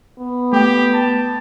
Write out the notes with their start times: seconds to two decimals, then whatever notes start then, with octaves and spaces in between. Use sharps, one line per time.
0.19 B3
0.53 A3 G4 G5
0.93 A5